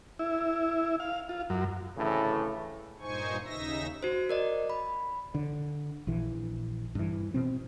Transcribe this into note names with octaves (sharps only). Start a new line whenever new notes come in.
E4
F5
F4
F#2
D2 A2 C#3 E3
G2 A#2 D#4 C5 G#5 C#6
D#2 C#3 D#4 E5 E6 A#6
F#4 C5
A#4 D5 D#5
B5
D3
A#1 E3
G2 E3
B2 C4